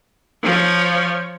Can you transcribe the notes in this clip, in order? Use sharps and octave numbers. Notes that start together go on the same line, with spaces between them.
F3 C#5